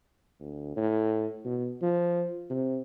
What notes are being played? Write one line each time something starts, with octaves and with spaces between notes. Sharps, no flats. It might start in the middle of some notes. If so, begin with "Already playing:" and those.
D2
A2
B2
F3
C3